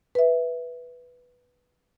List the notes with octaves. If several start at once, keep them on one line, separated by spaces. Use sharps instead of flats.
B4 E5